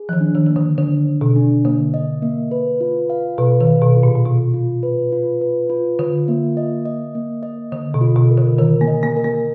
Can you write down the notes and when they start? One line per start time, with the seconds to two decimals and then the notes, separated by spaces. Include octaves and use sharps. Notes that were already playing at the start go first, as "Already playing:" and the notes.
Already playing: G#4
0.09 F3
0.13 D#3
0.21 D4
0.35 D#3
0.46 D#3 A#3
0.56 D3
0.78 D3 D4
1.07 D4
1.21 B2
1.36 D4
1.65 D3 A#3
1.94 D#5
2.22 A#3
2.51 B4
2.81 F4
3.10 F5
3.38 B2 B4
3.61 D#3
3.67 F5
3.81 B2
3.97 F4
4.03 A#2
4.15 A#2
4.25 B2 F4
4.54 F4
4.83 B4
5.12 F4
5.41 B4
5.70 F4
5.99 D3 F4
6.28 A#3
6.57 D#5
6.85 D#5
7.15 A#3
7.43 D#5
7.72 D3 D#5
7.94 B2
8.01 F4
8.16 B2
8.31 A#4
8.38 D3
8.58 D#3 A#4
8.81 A#3
8.87 D#5
9.03 A#3
9.17 A#4
9.24 A#3